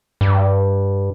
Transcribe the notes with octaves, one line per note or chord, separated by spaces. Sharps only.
G2